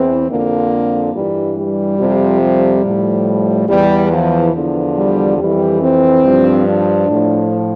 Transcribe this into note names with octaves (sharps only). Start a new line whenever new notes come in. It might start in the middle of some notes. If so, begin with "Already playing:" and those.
Already playing: E2 E3 C4
F2 D3 F3 A#3
G2 E3 G3
G3
F2 C3 F3
G3
A2 F3
E2 E3 G3
F3
E2 D3 F3
G3
F2 E3 G3
C4
G2 F3
D4
A2 F3